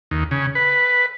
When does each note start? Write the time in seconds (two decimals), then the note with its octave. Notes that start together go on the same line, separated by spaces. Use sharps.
0.11 D#2
0.31 C#3
0.55 B4